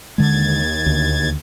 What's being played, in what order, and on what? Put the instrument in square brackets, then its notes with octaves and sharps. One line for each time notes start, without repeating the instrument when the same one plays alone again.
[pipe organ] D#2 G#6 A6 [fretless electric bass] D3 G#3
[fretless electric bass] D2